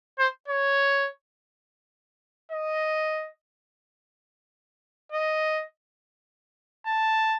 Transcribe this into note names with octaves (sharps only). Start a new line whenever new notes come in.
C5
C#5
D#5
D#5
A5